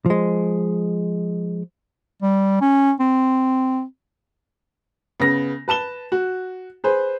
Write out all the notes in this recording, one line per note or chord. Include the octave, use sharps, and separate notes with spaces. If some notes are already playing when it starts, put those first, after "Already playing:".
F3 G#3
G3
C#4
C4
C#3 B3 A#6
B4 A5 E7 G7
F#4
G#4 B4 C5